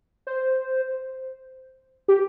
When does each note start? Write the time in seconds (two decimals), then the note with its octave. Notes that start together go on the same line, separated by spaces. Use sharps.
0.27 C5
2.08 G4